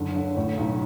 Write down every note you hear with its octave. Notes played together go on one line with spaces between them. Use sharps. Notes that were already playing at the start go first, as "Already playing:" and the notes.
Already playing: F#1 D3
D3
A2
B1